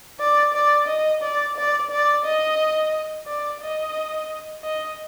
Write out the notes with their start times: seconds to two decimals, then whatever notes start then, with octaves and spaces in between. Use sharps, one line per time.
0.19 D5
0.53 D5
0.87 D#5
1.22 D5
1.56 D5
1.90 D5
2.24 D#5
3.26 D5
3.61 D#5
4.63 D#5